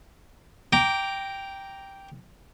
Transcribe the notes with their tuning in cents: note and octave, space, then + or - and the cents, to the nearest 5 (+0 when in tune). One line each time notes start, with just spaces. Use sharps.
G5 +0 A#5 +0 D6 -15